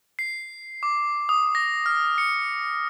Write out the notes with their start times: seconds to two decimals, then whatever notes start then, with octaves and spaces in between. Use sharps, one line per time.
0.19 C7
0.83 D6
1.29 D#6
1.55 A#6
1.86 F6
2.18 C#7